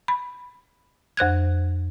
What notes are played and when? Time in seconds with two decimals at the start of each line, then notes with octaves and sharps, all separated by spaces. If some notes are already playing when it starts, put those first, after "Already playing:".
0.08 B5
1.17 F2 C5 F#6 G#6